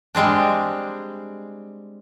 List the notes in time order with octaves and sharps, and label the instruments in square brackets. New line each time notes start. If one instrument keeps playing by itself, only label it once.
[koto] G3 G#3 C4 D4